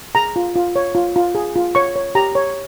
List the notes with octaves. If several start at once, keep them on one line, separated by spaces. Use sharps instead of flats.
G#4 A#5
F4
F4
C#5
F4
F4
G#4
F4
C#5 C#6
C#5
G4 A#5
C#5